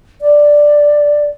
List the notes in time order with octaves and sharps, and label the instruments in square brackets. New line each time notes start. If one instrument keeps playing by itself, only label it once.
[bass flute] D5